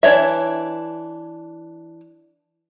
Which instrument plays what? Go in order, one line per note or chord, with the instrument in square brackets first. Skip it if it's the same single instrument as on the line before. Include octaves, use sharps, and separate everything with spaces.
[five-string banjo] E3 D4 C#5 E5